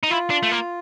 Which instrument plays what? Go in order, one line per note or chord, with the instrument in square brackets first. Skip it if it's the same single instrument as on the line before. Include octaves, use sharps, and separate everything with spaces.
[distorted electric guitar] D#4
[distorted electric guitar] E4 [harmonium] F4
[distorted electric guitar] D4
A3
A#3